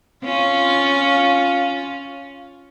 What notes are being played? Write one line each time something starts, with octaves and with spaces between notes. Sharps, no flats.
C#4 F4